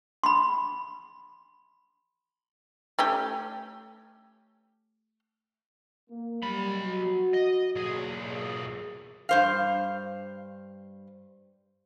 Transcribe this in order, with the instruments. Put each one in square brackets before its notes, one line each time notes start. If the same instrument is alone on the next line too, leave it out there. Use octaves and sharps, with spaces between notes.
[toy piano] B5 C6
[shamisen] A3 C#4 G4
[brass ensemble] A#3
[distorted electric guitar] F#3 B5 [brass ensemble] G3
[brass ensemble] F#4
[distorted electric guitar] D#5
[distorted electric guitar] B1 G#4 [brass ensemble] A#2 F#3
[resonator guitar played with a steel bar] G2 C5 F5